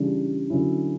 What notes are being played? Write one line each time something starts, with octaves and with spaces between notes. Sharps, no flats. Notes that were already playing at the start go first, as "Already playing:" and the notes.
Already playing: C#3 E3 G3 D4
D3 F#3 C#4 E4